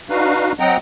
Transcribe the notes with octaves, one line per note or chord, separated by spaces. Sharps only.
D4 D#4 F#4 B4 F5
F#3 C4 D#5 F#5 G5 A#5